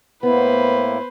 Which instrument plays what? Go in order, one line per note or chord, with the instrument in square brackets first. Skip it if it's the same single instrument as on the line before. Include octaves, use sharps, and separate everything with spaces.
[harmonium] A2 A#3 E4 [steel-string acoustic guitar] B3 [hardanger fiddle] B4 C5